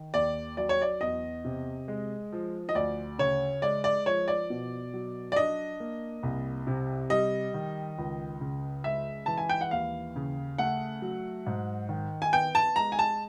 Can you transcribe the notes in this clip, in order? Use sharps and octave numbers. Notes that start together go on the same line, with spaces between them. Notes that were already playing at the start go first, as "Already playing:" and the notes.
Already playing: D#3
D#2 D5
F#3 D5
C#5
D5
E2 D#5
C3
G#3
F3
D#5
D2 D5
C#3 C#5
G#3 D5
D5
F3 C#5
D5
B2
F#3
D5
D4 D#5
A#3
C2
C3
G3 D#5
D#3
C#2
C#3
G#3 E5
E3 A5
G#5
G5
F#5
D#2 F5
C#3
A3 F#5
F#3
G#2
D#3
G#5
B3 G5
A5
G#3 A#5
G#5
A5